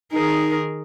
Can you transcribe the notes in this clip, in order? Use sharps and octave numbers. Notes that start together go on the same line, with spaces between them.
D#3 D#4 G#4 A#4